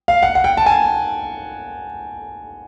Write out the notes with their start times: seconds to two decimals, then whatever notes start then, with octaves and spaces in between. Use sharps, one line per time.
0.08 F5
0.23 F#5
0.35 F#5
0.44 G5
0.57 A5
0.66 G#5